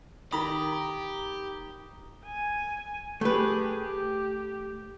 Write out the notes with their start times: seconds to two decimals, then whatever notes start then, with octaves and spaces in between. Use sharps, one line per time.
0.32 D#3 G4 A#4 A#5 B5 D#6 A#6
2.26 G#5
3.21 A3 G4 G#4 B4
3.81 G4